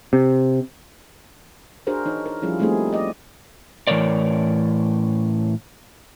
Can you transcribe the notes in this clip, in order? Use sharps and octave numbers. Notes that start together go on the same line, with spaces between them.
C3
D4 F#4 G#4 A#4 C5
E3 D#4 C#5
A#4
F3 G3 C#4 E4 F4 G#4
G3 A3 A#3 C4 D#4 G#4
D5 D#5
A2 E3 G3 A#4 C#5 D5